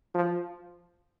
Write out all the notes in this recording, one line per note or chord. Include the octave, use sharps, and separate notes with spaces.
F3